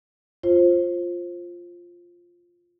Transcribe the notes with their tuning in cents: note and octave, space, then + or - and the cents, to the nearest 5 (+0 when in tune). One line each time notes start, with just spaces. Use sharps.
F4 +0 C5 +20